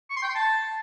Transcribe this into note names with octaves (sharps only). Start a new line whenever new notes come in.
C#6
C6
G5
C6
A5